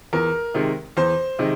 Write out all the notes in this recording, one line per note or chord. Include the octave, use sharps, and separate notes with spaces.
E2 A#4
C3 D#3 G#3
E2 C5
C3 D#3 G#3